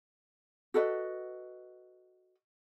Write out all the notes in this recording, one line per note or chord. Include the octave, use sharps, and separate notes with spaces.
F#4 A4 B4 D#5